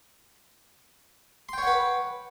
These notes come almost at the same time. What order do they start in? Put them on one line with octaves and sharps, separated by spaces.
C6 G5 C#5 F#5 B4